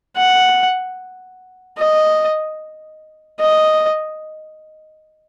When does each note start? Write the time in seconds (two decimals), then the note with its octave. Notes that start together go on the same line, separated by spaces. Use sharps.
0.17 F#5
1.78 D#5
3.39 D#5